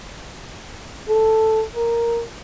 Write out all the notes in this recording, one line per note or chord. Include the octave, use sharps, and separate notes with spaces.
A4
A#4